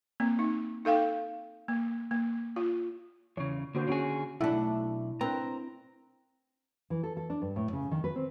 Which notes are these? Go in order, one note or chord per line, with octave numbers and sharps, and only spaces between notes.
A#3 C4
D#4
D#4 A4 F5 G5
A#3
A#3
F4
E2 C#3 C#5
D3 A#3 F#4 C5
D3 C#4 F#4 G#4 C#5
B1 A3 D4 E4 E5 F#5
C4 D4 A#4 B4 A#5
E3
A4
A4
D4
G2
A2
C#3
D#3
B4
C4